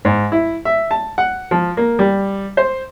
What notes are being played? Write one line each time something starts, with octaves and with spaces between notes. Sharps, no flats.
G#2
E4
E5
A5
F#5
F3
A#3
G3
C5